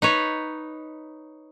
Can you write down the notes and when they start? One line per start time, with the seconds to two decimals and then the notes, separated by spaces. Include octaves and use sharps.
0.02 D#4 B4 C#5